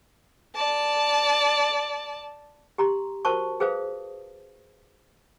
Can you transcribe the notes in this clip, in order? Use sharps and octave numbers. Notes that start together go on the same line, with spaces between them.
D5 A5
G4 A#5 C6
F#4 A#4 C5 A5 C#6
G#4 B4 C5 F5 D#6